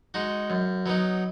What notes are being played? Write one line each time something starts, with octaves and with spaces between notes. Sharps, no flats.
G#3 D#4 F#4
F#2
F#3 B3 D#4